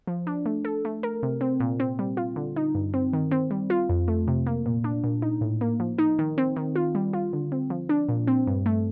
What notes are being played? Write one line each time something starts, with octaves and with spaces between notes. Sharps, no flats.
F3
D4
A3
A4
A3
A#4
C3
C4
A#2
C4
G3
F4
D3
D#4
G2
C4
D#3
C4
G3
F4
F2
A3
C3
A#3
A#2
D4
A#2
D#4
A2
A#3
F3
D#4
D#3
C4
D#3
F4
G3
F4
D3
C4
F3
D4
A#2
C4
G2
A3